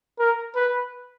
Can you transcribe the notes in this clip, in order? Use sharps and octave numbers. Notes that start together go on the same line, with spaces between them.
A#4
B4